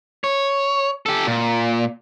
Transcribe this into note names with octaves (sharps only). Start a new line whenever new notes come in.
C#5
G4 A4
A#2